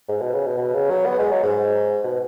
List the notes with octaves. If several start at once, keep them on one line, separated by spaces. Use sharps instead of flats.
G#2
B2
C#3
B2
B2
C#3
F#3
B3
G#3
F#3
G#2
B2